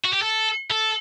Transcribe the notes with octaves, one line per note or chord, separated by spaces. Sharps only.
F#4
G4
A4
A4